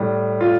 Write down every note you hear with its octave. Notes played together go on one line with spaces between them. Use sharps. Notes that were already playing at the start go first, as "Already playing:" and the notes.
Already playing: A2 G3
F4